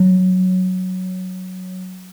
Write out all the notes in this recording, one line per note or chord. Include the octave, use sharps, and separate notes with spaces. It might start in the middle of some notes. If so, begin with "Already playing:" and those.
Already playing: F#3